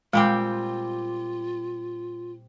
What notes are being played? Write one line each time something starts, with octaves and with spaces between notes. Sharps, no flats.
A#2 G3 G#3 C4 F4